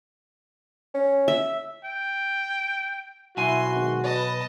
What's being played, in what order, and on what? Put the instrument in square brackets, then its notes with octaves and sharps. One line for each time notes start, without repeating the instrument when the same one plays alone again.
[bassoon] C#4
[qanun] E5
[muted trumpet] G5
[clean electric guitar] B1 G#5 [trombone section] E4 [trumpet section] F#4 [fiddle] C6
[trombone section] G#1
[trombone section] B4 [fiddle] D#5 A5